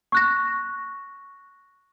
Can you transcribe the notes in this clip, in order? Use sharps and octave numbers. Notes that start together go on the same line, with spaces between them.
C#6 F#6 A#6